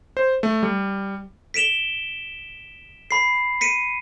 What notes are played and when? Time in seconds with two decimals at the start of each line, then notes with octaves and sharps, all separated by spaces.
0.17 C5
0.43 A3
0.63 G3
1.54 B6 D7 E7 F7 G7
3.11 B5 C7
3.61 B6 C#7 D#7